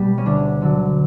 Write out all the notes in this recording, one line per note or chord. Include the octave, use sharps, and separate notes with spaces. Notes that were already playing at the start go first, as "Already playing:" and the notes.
Already playing: B2 G3
C#4
D2 D4
D3 F#3